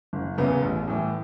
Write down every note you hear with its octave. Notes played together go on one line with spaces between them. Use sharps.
F#1
E2 C#3 E3 B3
A1
A2 E3